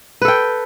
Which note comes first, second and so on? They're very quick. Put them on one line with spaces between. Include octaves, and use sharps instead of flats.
B4 A4 G5